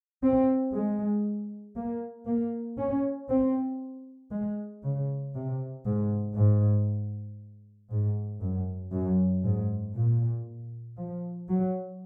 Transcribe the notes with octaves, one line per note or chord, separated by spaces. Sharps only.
C4
G#3
A#3
A#3
C#4
C4
G#3
C#3
C3
G#2
G#2
G#2
F#2
F#2
G#2
A#2
F3
F#3